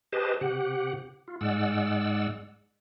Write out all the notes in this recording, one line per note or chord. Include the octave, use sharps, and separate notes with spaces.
G4 G#4 B4 C5 D#5 A5
C3 G4 F#5
F4
G#2 G#3 D5 F#5 E6